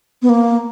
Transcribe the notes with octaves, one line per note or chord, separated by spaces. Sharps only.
B3
A#3